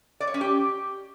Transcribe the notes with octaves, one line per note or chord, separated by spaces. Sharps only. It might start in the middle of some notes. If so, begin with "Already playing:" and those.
D5
C#5
C#4
G4